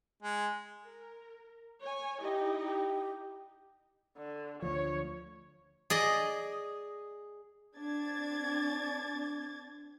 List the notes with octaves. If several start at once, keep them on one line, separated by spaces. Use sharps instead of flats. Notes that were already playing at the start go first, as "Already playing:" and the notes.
G#3
A#4
C#5 G#5
D#4 E4 G4 D#5
G4
D3
D2 F3 C#5
G#4 D5 D#5
C4 D4 G#6 A6